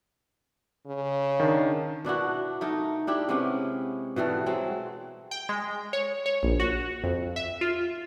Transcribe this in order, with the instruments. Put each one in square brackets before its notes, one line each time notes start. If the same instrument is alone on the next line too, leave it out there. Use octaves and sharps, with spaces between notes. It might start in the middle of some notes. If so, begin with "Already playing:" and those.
[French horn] C#3
[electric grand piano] D#3 D4
[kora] B2 D4 E4 F#4
A3 D#4 A#4
D4 E4 G4
C3 G#3 B3 C#4
B2 E3 G3 A3
F#3 G#3 C4
[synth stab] G5
G#3
C#5
C#5
A#1
F#4
F2
E5
F4